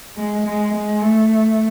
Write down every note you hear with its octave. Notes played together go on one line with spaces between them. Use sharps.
G#3
G#3
G#3
A3